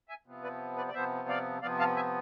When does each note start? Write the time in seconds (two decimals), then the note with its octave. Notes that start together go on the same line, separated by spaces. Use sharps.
0.09 E5 G#5
0.26 C3 F3 B3
0.43 B4 D5
0.77 B4 D5
0.88 D5
0.94 C3 F3 B3 C5 E5
1.28 D5 F5
1.62 C3 F3 B3 D5 F5
1.79 F5 A5
1.96 E5 G#5